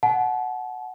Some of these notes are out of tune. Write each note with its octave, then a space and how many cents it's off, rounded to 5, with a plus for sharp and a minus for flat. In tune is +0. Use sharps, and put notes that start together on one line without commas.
F#5 +0 A5 -35